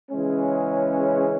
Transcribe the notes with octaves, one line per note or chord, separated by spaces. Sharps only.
C#3 E3 G#3 C#4